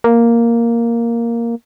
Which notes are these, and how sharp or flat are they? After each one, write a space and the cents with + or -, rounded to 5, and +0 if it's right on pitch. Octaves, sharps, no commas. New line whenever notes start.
A#3 +0